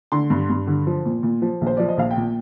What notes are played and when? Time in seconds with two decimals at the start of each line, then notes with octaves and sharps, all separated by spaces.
0.12 D3 C6
0.30 G2
0.50 G2
0.67 D3
0.87 F3
1.05 A#2
1.23 A#2
1.42 F3
1.61 A#1
1.67 C5
1.77 F3 D5
1.89 D#5
1.97 A#1 F5
2.11 G5
2.17 A#2